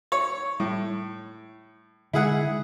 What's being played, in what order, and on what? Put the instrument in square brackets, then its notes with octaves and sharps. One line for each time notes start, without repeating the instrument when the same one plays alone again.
[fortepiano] C#5
[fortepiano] A2 [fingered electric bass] G3
[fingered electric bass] D3 G#3 [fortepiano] E4 G#4 F#5